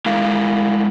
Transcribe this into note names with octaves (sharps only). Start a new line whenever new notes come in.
G#3 E4 A#4 F5